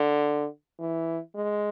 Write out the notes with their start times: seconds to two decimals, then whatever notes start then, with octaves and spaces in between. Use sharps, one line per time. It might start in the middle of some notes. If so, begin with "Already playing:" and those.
Already playing: D3
0.79 E3
1.35 G#3